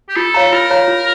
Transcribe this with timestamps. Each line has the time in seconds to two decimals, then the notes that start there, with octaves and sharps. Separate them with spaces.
0.09 G4
0.16 F4 A4
0.34 C#5 F5 A#5
0.52 F4 A#4
0.70 C#5 F5 A#5
0.88 F4